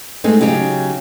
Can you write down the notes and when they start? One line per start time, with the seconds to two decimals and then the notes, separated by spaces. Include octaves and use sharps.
0.24 G#3 A3 C4 D#4
0.41 C#3 F#3 D#4 G4